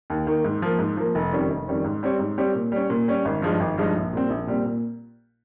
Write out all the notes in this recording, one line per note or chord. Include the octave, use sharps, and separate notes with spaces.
D#2
D#3 A#3
G#2
F3 A#3
G#2
F3 A#3
F1
F2 D#3 G3 C#4
F1
F2 D#3 G3 C#4
G#2
G3 C4 G4 C#5
G#2
G3 C4 G4 C#5
A#2
G3 C#4
A#2
G3 C#4
G#1
G2 F3 G#3 D#4
G#1
G2 F3 G#3 D#4
A#1
A#2 G3 C4
A#1
A#2 G3 C4
A#2